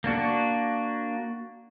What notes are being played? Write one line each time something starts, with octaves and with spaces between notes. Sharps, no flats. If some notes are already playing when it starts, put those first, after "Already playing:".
A#3 D4 F#4